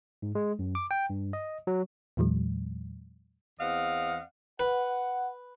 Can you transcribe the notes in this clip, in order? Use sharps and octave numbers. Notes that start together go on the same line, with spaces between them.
G#2
G#3
F#2
D6
G5
G2
D#5
F#3
E2 A#2 E3 F#3 G#3
E2 C4 D#5 F5 F#5
B4 F#5